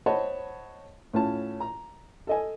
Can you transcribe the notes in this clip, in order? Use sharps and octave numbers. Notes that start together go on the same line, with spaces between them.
C5 C#5 D#5 F#5 A5 B5
A2 C#4 F4 A5
A#5
A4 D#5 G#5